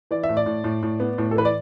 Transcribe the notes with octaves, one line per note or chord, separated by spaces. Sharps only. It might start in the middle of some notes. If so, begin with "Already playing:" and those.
E3 D5
E5
A2
D5
A2
A2
A2
B3
A2
A4
E3 B4
D5